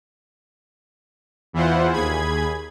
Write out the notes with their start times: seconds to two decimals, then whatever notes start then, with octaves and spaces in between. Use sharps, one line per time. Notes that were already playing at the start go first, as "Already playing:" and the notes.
1.53 E2 E3 E4 F4 C5 F#5
1.93 D#2 G#4 B5 G#6